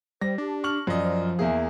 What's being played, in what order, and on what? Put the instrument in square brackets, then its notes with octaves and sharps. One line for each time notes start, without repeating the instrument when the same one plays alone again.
[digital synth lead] G3 [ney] C5 [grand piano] A#6
[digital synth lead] D4 [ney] G4
[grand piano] C#6 F6 F#7
[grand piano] F#2 D#5 [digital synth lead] F3 [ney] D5
[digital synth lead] F3
[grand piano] E2 A#3 G#4 [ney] E5